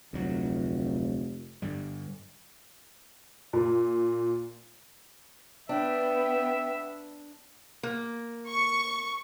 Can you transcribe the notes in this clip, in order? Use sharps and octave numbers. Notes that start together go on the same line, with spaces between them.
F1 D2 F#3
G2 D3 G3
A#2
B3 D4 E5 G5
A#3
C#6